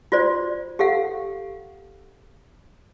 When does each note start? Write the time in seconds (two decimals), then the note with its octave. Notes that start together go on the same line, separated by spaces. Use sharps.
0.12 F4 F#4 C5 D5
0.79 G4 A4 F5 F#5